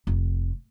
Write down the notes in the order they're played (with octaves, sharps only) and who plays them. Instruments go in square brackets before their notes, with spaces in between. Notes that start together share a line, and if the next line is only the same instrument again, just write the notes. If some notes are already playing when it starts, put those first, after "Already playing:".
[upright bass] F1